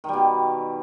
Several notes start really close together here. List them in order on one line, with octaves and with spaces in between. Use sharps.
D#3 G3 B2